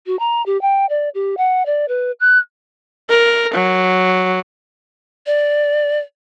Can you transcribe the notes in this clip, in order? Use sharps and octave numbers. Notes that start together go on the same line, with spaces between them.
F#4
A#5
G4
G5
D5
G4
F#5
D5
B4
F#6
A#4
F#3
D5